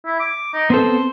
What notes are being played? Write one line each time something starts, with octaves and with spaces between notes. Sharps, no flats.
E4
D6
D#4
B3 C4 A4 C5